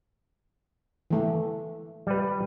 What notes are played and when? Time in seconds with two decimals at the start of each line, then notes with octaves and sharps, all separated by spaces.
1.11 E3 A3
2.07 G3 B4